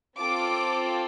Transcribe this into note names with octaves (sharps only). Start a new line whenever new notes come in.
C4 F4 A4 D6